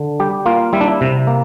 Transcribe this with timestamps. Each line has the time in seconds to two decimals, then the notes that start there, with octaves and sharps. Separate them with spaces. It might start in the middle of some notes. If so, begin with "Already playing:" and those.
Already playing: D3
0.20 G3 G4
0.46 A#3 F4
0.73 G3 E4
0.81 D4
0.88 E4
1.01 C3
1.27 A#3